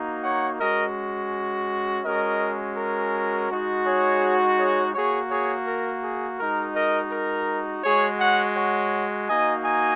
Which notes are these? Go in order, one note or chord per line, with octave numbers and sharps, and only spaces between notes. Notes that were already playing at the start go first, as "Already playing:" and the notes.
Already playing: A#3 D#4 F#4
C#5 F#5
G#3 C#4 F#4 A#4 D#5
G#3 C#4 F#4 A#4 D#5
A#4
G#3 D#4 F#4
G#4 C#5
G#4 C#5
A#3 F#4 G#4 C#5
G#4 C#5
A#4
G#4
G#3 D#4 F#4 A#4
A#4 D#5
A#4
G#3 F#4 G#4 C#5
C#5 F#5
C#5 F#5
A#3 D#4 F#4 D#5 G#5
D#5 G#5